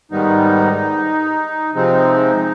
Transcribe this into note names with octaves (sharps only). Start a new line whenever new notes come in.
G#2 D#3 G3 B3 D#4
C3 F3 G#3 C4 D#4